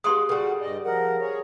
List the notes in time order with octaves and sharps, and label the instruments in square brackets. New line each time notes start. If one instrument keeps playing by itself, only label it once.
[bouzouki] F#3 G#3 A#3 [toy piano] G4 C6 D#6
[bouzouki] C#3 G3 [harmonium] F#4 F#5 [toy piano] A4
[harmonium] G2 D5 D#5
[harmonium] F3 F#5 [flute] A#4
[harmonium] G#4 C#5